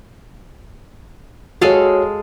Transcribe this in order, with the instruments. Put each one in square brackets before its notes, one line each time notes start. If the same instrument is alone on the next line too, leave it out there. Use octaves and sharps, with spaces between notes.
[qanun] G#3 A4 F5 [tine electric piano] F#4 C#5